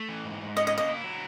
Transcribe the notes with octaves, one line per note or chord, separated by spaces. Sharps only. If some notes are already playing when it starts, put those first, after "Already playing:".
Already playing: A3
E3
G#2
G#2
C#4 D#5
D#5
A#3
D#5
E4
F#3